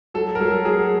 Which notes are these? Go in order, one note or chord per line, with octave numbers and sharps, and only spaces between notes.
F#3 A4
A#4
F#3 A4
F#3 G#4